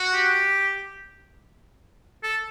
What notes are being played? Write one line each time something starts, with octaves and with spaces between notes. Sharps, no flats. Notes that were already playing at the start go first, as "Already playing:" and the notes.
Already playing: F#4
G4
A4